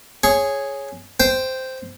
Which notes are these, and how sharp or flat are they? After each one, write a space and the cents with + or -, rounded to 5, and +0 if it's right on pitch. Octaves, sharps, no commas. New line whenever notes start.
G#4 +0 C#5 -5
C5 -5 G5 +0